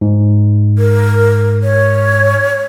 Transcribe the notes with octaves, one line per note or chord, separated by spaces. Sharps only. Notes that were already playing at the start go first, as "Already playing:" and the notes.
G#2
A#4
C#5